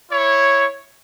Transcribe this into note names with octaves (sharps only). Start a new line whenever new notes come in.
E4 C#5